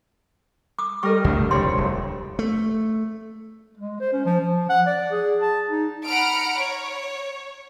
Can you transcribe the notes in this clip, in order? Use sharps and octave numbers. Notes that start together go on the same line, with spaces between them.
D6 D#6
G3 A4 A#4 D#5 C#6
C#2 A3 D4
F1 G3 C4 D4 C#5 C6
D1
A3
G#3
C5
C#4
F3
F3
F#5
D5
G#4
A5
D#4
F#5 A#5 B5 F6 D7
C#5